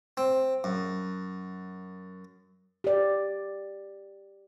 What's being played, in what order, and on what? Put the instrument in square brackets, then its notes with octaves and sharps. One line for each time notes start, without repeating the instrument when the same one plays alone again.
[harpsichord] C4
F#2
[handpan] G4 D5